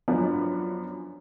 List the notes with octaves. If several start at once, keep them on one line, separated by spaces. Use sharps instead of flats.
F#2 F3 B3 D4